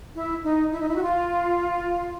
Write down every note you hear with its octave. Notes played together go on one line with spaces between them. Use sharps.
E4
D#4
E4
D#4
E4
F#4
F4